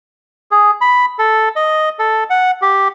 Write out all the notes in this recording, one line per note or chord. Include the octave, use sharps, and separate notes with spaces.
G#4
B5
A4
D#5
A4
F#5
G4